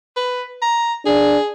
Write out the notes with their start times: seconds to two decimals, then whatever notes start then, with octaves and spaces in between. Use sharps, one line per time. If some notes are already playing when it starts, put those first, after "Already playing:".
0.16 B4
0.62 A#5
1.06 D4 G#4